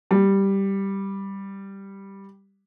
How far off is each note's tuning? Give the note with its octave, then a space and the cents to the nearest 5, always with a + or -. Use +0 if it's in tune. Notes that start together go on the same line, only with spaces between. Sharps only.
G3 +0